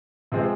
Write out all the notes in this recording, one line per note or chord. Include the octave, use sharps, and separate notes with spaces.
C3 F3 G#3 C4